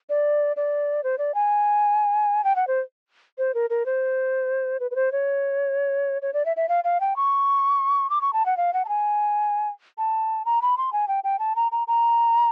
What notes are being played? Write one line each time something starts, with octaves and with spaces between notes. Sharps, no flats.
D5
D5
C5
D5
G#5
G5
F#5
C5
C5
A#4
A#4
C5
B4
B4
C5
C#5
C#5
D5
E5
E5
F5
F5
G5
C#6
D6
C#6
A5
F#5
F5
F#5
A5
G#5
A5
A#5
B5
C6
G#5
G5
G5
A5
A#5
A#5
A#5